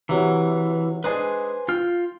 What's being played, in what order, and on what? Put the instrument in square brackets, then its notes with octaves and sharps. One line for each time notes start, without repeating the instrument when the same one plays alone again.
[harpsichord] C3 F#3 [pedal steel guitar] E3
[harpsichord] G#3 D4 D#4 [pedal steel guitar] B4 C5 G#5
[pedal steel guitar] F4 F6 [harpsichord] G5